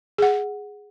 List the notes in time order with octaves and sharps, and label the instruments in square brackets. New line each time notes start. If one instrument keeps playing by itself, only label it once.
[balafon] G#4 F#5